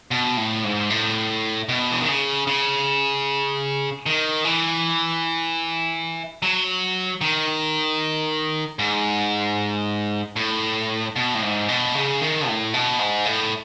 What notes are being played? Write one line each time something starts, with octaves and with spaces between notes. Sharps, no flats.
B2
A2
G#2
A2
B2
E3
D#3
C#3
C#3
D#3
E3
F#3
D#3
G#2
A2
B2
A2
G#2
B2
C#3
D#3
A2
B2
G#2
A2